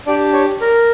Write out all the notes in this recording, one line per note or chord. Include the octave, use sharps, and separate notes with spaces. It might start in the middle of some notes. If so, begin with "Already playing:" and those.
D4 G4 D5
C#5
A#4